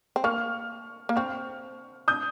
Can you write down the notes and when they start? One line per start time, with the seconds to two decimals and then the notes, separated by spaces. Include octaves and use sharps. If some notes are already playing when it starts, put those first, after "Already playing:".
0.16 C4
0.24 A#3 C#6 F6
1.09 A#3
1.16 C4 C#6 F6
2.08 D#6 G6